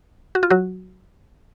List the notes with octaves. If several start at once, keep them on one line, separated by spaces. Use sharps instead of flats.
F#4
F4
F#3 F#4